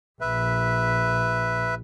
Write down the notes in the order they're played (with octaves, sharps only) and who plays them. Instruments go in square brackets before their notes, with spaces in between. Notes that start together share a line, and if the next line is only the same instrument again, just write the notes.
[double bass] A#1 [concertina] B4 E5